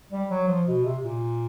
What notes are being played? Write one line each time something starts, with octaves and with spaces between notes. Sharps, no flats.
G3
F#3
F3
B2
C3
A#2